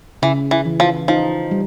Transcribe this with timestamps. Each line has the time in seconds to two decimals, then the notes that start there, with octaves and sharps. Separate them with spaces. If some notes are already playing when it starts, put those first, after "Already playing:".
0.22 C#3 E3
0.51 E3
0.66 E3
0.80 F3
1.08 F3 D#4
1.51 G3